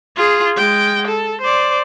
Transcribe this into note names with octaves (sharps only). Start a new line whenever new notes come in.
F4 G#4
G#3 G5
A4
C5 D5